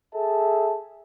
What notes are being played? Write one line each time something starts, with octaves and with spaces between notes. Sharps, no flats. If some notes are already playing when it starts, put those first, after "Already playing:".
G#4 A4 E5 A5